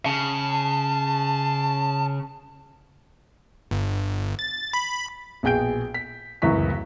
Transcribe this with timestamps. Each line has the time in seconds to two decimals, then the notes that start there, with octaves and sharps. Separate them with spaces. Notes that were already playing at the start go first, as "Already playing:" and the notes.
0.06 C#3 A5
3.71 G1
4.39 A6
4.73 B5
5.43 A#1 B2 G#4 G5 G6 D7
5.94 B6
6.42 D1 C#2 F#2 E3 C#6 B6